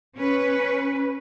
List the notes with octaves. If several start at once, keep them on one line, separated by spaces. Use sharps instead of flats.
C#4 B4